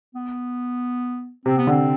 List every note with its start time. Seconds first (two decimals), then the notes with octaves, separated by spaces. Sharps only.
0.15 B3
1.45 C3 C4
1.58 B3
1.67 D3
1.71 C4